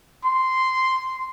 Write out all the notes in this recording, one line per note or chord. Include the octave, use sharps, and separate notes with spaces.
C6